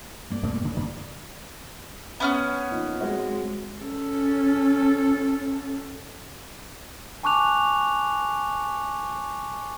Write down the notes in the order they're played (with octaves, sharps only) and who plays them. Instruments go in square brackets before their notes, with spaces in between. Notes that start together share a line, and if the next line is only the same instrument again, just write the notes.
[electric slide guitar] G2 A#3 D5
[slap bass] B2 A3 C4
D2 C#3
[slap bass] F#2 D3 E3 [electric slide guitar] D5
[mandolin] B3 C#4 F6
[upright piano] A#2 F3 D#4
[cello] G#3 [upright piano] C4 F#4 C#5
[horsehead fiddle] C#4 A4
[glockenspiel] G#5 A5 C#6 D6 F#6 F7